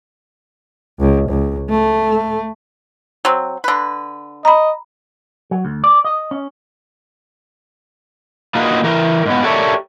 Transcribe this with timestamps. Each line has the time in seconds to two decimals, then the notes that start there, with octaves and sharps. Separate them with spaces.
1.00 C#2
1.30 C#2
1.70 A3
3.25 F#3 C4
3.64 D3 B4
4.45 D#5 A#5 B5
5.51 F#3
5.65 D2
5.84 D5
6.05 D#5
6.31 C#4
8.55 A#3 D#4 F4 F#4 G#4 B4
8.84 E3 A#4
9.26 G#2 B3
9.43 G4 A4 A#4 C#5 D5 E5